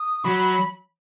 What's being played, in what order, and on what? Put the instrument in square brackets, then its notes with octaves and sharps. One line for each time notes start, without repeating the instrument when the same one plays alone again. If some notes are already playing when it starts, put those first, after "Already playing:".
Already playing: [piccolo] D#6
[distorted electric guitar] F#3 [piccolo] B5